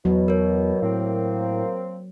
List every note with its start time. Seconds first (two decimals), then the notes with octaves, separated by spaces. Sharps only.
0.05 E2 B2 F#3
0.28 A#4 C#5
0.82 A2 A#3 C4